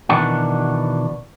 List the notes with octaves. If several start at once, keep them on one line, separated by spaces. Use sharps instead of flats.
B2 D#3 E3 D4 F#4